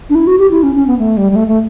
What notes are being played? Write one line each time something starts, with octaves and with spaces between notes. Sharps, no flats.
D4
E4
F#4
G4
E4
C#4
C#4
B3
A3
G3
G3
A3
A3